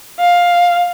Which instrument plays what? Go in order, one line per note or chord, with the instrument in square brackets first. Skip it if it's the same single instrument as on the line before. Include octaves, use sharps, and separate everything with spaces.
[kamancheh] F5